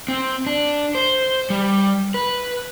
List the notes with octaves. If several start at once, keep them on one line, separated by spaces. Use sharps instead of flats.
C4
D4
C5
G3
B4